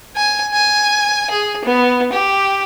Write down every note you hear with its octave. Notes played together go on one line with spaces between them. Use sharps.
G#5
G#5
G#4
B3
G4